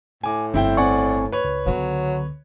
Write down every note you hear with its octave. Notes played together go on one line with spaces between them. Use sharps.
A2 G#5 D6
G1 C4 E4 G5
C4 D5 F#5 G#5 C#6
B4 C#5
C#2
D3 F#3 B3